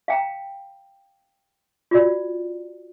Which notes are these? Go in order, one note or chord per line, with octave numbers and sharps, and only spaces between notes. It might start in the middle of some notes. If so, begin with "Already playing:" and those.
F5 G5 A#5
F4 F#4 D5